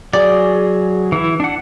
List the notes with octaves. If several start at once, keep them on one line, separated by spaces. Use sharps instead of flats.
F#3 G#4 D5
E3 E4
D4 F#5